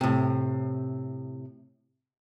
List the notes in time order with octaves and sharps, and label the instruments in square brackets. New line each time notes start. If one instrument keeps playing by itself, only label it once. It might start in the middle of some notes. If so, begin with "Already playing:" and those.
[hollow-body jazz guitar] A2 C3